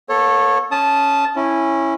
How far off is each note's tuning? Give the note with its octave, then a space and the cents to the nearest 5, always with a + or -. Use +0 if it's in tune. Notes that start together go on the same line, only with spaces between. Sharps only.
A#3 +45 A4 +0 C#5 -20
C#4 +0 A5 -15 D#6 +0
C#4 -15 E4 +0